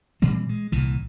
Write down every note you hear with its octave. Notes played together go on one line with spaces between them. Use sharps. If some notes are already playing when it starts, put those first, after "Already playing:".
A#2 E3 G3 C4
G#3
C2 A#2 E3